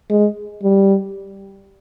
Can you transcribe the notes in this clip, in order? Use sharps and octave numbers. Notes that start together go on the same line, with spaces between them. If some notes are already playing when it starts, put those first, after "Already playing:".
G#3
G3